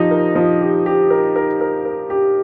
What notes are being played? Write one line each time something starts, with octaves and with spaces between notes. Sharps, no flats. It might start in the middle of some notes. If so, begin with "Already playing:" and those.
Already playing: F3 D#4 G4
A#4
F3
G4
G4
A#4
A#4
A#4
A#4
G4